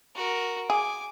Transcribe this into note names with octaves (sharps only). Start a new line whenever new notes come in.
F#4 A#4
G#4 G#5 D6